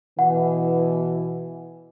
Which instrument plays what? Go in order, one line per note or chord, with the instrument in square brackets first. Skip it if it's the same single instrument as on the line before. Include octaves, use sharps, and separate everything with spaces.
[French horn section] B2 E3 [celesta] F#5